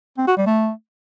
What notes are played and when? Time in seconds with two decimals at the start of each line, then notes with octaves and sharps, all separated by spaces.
0.18 C4
0.27 F#4
0.37 G3
0.46 A3